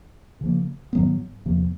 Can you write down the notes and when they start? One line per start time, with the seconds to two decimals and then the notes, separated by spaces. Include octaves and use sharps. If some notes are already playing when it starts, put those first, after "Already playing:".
0.41 C#3 F3 A#3
0.93 G#2 D#3 F#3 B3
1.45 E2 C3 F3 A#3